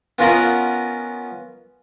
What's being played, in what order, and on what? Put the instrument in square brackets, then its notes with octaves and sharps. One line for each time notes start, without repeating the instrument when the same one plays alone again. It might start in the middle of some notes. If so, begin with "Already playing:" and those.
[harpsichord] B3 C#4 F4 A#4 D#5 F#5